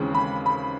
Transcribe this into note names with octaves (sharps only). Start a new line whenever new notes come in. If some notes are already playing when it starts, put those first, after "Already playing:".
Already playing: D#2 C#3 E3 G#3 C4
B5
B5